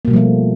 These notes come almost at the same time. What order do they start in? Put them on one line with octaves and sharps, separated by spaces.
A#3 B2 G3 F3 A3